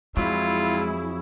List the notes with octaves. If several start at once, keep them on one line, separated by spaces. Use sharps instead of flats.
F2 F#3 G#3 E4 F4 G#4